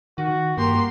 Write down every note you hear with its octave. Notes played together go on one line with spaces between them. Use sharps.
D#3 F#4
G2 A#3 G4 C6